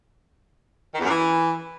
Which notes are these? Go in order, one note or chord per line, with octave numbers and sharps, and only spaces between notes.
D#3
E2
F#2
E3